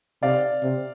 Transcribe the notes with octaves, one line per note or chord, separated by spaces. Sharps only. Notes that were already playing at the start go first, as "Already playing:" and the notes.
C3 D5 F5
C3